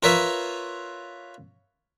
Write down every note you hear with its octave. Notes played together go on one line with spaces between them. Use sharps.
F4 A#4 B4 C#5 E5